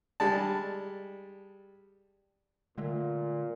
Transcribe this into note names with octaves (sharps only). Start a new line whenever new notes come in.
G3 G#3 A5
A#2 D3 G#3 A3